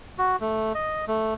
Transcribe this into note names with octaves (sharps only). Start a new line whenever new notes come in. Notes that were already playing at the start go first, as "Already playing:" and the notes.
F#4
A3
D#5
A3